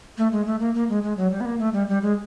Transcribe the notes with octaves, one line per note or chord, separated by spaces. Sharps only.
A3
G#3
A3
A#3
A#3
G#3
G#3
F#3
G3
B3
A#3
A3
G3
G3
G#3